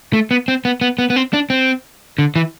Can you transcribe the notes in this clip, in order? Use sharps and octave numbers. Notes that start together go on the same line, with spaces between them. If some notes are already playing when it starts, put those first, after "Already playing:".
A3
B3
C4
B3
B3
B3
B3
C4
D4
C4
D3
E3